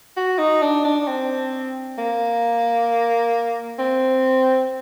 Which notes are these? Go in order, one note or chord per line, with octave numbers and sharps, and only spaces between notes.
F#4
D#4
D4
D4
C4
A#3
C4